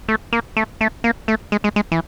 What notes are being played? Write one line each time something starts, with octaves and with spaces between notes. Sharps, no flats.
A3
A#3
A3
A3
A#3
A3
G#3
G#3
G#3
E3